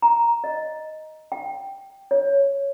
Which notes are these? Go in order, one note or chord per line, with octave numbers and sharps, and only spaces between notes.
A#5
D#5
G5
C#5